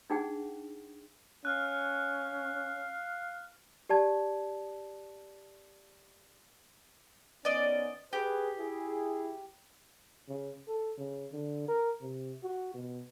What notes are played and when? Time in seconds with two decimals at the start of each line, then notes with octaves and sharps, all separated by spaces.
0.10 D4 D#4 G#4 F#5 G5
1.45 C#4 F5 F6 F#6
3.89 G4 D5 A5 G#6
7.45 D#3 B3 C#4 D5 D#5
8.13 G4 G#4 B4
8.58 E4 G#4
10.29 C#3
10.68 A4
10.98 C#3
11.33 D3
11.68 A#4
12.01 C3
12.43 F#4
12.74 B2